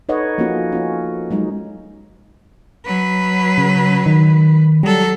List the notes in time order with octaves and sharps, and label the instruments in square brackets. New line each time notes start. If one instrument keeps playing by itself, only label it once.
[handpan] D#4 A4 B4 C#5 D#5 F#5
F3 A#3 B3 C#4 F4 F#4
C#4 F4
F#3 G#3 D#4
[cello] F#3 B4
[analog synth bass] C#3
D#3
[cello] F#3 A4 [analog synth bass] G3